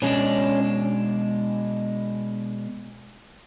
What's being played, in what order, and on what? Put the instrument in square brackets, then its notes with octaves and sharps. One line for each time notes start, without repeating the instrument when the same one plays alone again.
[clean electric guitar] B2 G#3 D4 [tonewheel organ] C#4